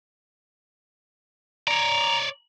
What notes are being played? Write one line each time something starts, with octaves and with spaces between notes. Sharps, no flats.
C#5 D5 A#5